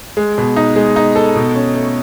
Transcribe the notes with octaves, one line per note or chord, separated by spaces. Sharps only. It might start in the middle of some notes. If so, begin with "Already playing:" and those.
G#3
B2
D#4
G#3
D#4
A4
B2
C#4
A3